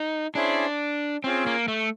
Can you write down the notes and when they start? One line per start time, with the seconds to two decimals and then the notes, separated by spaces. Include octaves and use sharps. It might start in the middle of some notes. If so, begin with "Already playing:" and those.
Already playing: D#4
0.35 C#4 D4 E4 G#4 C5 E5
1.24 C4 C#4 F4 G#4
1.47 A#3
1.68 A3